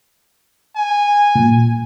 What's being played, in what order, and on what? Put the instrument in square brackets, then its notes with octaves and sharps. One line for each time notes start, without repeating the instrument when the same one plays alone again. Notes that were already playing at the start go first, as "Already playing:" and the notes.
[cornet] G#5
[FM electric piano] A#2